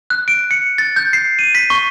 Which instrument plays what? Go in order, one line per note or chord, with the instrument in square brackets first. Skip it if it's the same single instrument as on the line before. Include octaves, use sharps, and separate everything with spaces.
[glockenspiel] F#6
D7
C#7
A6
G6
C7
D#7
B6
C#6